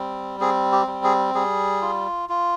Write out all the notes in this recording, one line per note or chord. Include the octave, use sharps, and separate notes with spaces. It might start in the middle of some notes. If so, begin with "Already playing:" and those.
Already playing: G3 C4
C4 G#4
G4
G3
G#4
G3 G#4
F4
F4